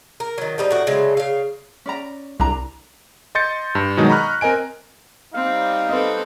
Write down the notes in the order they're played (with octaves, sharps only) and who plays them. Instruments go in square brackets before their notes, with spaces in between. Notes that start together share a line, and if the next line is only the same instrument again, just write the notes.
[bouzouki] A#4
D#3 F#3
F3 G3 D#4
A2 F#4
C#3 F#3 G#3 A3
C#3 F5
[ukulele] C#4 D5 A#5
[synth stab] C2 [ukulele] D4 A#5
[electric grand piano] D#5 C6 G6 A6 C#7
G2
B2 D#3 F#3 G#3 D#4
D#5 A#5 B5 C#6 F6 F#6
C4 A#4 D#5 G#5 D7
[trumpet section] G3 D#4 [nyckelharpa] C4 [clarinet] F5
[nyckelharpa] C4 A4 [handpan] B4 D#5